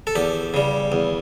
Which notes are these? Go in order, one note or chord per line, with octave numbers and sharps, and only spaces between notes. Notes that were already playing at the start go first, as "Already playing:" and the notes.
A4
E2 G4
C#3 G3
E2